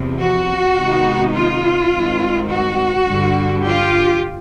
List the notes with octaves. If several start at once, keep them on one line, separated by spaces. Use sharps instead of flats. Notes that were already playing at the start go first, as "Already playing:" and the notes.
Already playing: E2 C3 F3
F#4
C3 D#3 G#3 B3 D#4
F4
G2 D#3 G#3 C4
F#4
G2 D3 G3
F4 G4